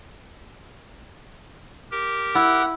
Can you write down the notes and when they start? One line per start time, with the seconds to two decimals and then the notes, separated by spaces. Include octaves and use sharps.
1.91 G4 A#4
2.35 E4 F#5